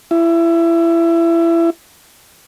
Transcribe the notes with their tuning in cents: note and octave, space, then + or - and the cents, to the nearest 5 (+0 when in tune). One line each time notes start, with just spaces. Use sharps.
E4 +25